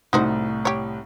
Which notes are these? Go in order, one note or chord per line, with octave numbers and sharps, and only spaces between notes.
C2 A2 D#4 F#4 C5
G4 C#5